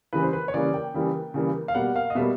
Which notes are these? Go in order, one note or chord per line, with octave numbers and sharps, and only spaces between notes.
C#3 E3 G3 A#3 B4
C5
B4
C#5
C#3 E3 G3 A#3 D5
G5
C#3 E3 G3 A#3
C#3 E3 G3 A#3
F5
B2 G3 A#3 F#5
F5
D#5
B2 G3 A#3 E5